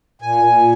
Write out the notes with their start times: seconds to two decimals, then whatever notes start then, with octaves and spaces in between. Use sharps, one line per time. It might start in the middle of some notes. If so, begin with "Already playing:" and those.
0.22 A#2 G#5
0.44 A#2